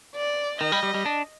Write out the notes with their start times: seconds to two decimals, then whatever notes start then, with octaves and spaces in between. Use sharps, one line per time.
0.15 D5
0.60 D#3 D#5
0.72 G3
0.83 G3
0.95 G3
1.06 D4